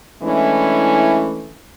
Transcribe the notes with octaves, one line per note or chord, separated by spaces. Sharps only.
E3 G#3 A3 C#4 D4 E4